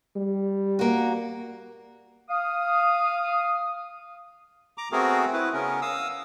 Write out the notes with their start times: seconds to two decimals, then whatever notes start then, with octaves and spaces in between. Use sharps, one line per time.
0.16 G3
0.79 A#3 F#4
2.29 F5 D#6
4.78 A#5 D6
4.92 A3 B3 C4 F#4 G#4 A#4
5.33 E4 B4
5.53 C#3 B3 C#4 A#4
5.82 F5 D#6 E6